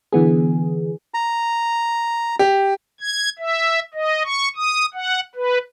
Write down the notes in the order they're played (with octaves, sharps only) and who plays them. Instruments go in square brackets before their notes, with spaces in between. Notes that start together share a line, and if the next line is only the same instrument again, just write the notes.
[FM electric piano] D3 E3 B3 G#4
[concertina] A#5
[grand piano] G4
[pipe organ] G#6
E5
D#5
C#6
D#6
F#5
B4